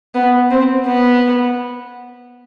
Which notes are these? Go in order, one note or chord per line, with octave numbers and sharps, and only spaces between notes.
B3
C4
B3